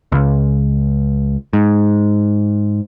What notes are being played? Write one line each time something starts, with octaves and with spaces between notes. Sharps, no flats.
C#2
G#2